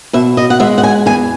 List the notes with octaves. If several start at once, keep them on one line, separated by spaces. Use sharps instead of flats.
B2 E5
D#5
F#5
G#3 E5
F#5
G#5
E2 G#5